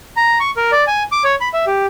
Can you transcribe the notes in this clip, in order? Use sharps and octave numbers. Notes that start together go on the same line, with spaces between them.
A#5
C#6
A#4
D5
G#5
D6
C#5
B5
E5
G4